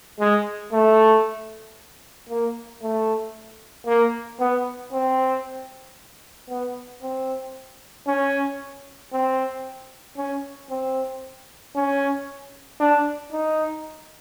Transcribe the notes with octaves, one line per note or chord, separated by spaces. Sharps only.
G#3
A3
A#3
A3
A#3
B3
C4
B3
C4
C#4
C4
C#4
C4
C#4
D4
D#4